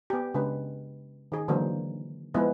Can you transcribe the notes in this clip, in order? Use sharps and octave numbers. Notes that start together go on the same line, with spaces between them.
B3 G4
C#3 G#3 D4 B4
D#3 G#4
D3 E3 F#3 G#3 A#3 C5
F3 G#3 B3 E4 B4